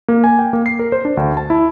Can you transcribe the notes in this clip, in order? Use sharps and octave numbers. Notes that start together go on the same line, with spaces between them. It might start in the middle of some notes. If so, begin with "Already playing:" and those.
A#3
G#5
G5
A#3
C7
A#4
C5
D4
D2
A5
E4